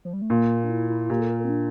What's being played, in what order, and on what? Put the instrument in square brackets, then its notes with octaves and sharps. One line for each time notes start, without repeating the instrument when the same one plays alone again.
[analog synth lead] F3
G3
A3
[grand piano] A#2 [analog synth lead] A#3
[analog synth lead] D4
E4
E4
[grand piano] A#2 [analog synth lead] G4
[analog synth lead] A4
A#4
A4
C4
D4